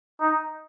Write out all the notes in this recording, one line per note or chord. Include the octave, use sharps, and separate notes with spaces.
D#4